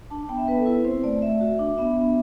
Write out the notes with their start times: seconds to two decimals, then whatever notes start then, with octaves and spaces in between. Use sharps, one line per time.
0.10 D4 A5
0.29 B3 G5
0.38 E5
0.47 B3 B4
0.58 A4
0.66 E4 B4
0.85 C4 C5
1.03 A3 D5
1.21 A3 E5
1.41 F#4
1.59 D4
1.78 B3 E5
1.97 B3